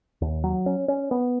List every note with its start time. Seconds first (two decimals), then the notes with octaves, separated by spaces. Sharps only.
0.21 D#2
0.44 F#3
0.66 C#4
0.88 C#4
1.11 B3